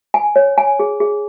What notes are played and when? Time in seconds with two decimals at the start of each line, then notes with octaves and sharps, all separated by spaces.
0.14 G#5
0.36 C#5
0.58 G#5
0.80 G#4
1.00 G#4